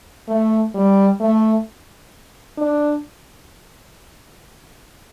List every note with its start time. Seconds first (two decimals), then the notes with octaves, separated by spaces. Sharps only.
0.28 A3
0.74 G3
1.20 A3
2.58 D4